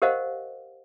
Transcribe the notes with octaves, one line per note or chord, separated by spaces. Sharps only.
G4 A#4 C5 D#5 F5 F#5